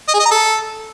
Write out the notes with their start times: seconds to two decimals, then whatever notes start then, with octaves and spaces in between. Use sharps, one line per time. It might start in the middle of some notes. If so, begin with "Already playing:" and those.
0.08 D#5
0.14 G#4
0.20 D#5
0.26 A#5
0.31 A4